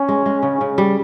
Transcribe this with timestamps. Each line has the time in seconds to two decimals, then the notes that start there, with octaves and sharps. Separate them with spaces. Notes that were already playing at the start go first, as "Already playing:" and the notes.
Already playing: C#4
0.09 G#3
0.26 G#3
0.43 C#3
0.61 C#3
0.78 G3